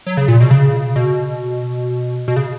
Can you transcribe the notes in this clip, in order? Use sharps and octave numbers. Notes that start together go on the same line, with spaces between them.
F#3
C#3
A#2
B2
C#3
B2
B2
C#3